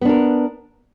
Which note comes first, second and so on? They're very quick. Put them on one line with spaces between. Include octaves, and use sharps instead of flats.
B3 D4 A#4